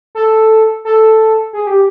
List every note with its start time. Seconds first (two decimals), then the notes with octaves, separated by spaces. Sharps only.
0.15 A4
0.85 A4
1.53 G#4
1.67 G4